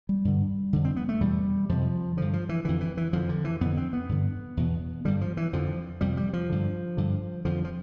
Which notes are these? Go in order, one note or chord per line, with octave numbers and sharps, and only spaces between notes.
G3
G2 D3
F2 D3
C4
B3
A3
E2 B2 G3
F2 C3 F3
G2 D3 F3
F3
E3
F2 D3 E3
E3
E3
F2 D3 F3
D3
E3
F2 D3 B3
C4
B3
G2 D3
E2 B2
G2 D3 G3
F3
E3
F2 D3 F3
F2 C3 G3
G3
F3
G2 D3
G2 D3
F2 D3 F3
F3